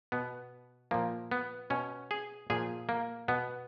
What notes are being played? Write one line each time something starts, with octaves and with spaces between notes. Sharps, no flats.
B2 B3
A#2 F3 A#3
B3
B2 C#4
G#4
A#2 F3 G#4
A#3
B2 B3